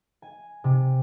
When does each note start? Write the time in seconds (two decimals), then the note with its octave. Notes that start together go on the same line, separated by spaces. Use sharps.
0.22 G#5
0.64 C3